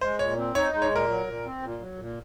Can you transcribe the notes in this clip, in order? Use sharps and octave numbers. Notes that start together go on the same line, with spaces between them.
G#3 C5
A#2 C#5
C4
D#4 C#5
G#3
C#5
A#2 A#4
F#3
A#2
C4
A#2
F#3
A#2